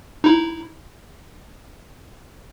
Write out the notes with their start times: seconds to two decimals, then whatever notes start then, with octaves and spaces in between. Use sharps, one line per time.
0.24 D#4 E4